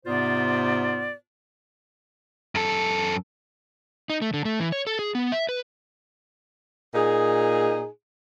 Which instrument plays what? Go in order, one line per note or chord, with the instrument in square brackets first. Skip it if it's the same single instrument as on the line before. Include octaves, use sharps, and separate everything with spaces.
[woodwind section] G#2 C3 B3 F4 C5 D5
[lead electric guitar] F#2 A4
[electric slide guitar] D#4
A3
D3
A3
E3
C#5
A4
G#4
B3
E5
B4
[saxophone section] A#2 D#4 G#4